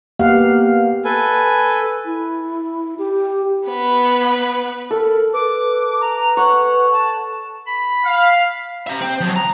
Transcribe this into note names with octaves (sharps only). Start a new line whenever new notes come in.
A#3 B3 G4 F5 F#5
A4 B4 G#5
E4
G4
B3 B4
A4 A#4
B4 D6
A#5
C#5 F#5
A5
B5
F5
E5 A#5
C4
F3 F#3
A#5